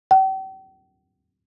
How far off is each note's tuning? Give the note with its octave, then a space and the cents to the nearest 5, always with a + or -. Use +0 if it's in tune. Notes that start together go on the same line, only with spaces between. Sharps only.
G5 -40